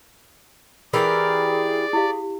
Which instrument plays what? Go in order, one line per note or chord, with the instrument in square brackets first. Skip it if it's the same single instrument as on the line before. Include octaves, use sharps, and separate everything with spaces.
[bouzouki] E3 G4 A#4 [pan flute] G#4 [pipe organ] D5 [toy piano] E6
[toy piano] E4 G4 F5